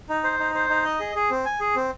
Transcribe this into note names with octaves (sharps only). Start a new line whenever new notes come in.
D#4
C5
D#4
C5
D#4
D#5
G#4
G#4
C4
G#5
G#4
C4